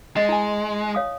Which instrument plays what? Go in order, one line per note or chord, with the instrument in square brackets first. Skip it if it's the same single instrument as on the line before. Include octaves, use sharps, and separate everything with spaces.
[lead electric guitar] G#3 [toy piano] D#5
[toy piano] E4 G#5
C#5 F5 D#6